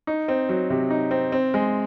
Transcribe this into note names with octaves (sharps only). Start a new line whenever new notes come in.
D#4
C4
F#3
C3
D#4
C4
C4
G#3